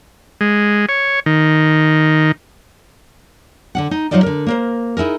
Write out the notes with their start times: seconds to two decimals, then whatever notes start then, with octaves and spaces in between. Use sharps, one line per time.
0.41 G#3
0.89 C#5
1.26 D#3
3.75 D3 D4 F#5
3.91 D#4
4.11 F#3 D#4 F4 C5 D5 D#5
4.23 D3 A#4
4.46 A#3 A#4 C5
4.97 D#4 E4 G#4 A#4